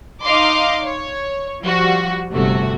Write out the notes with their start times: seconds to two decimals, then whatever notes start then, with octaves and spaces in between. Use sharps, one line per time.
0.23 D#4 D#5 F5 C6 D6
0.84 C#5
1.63 F3 G3 F#4
2.31 G1 C3 A3 F#4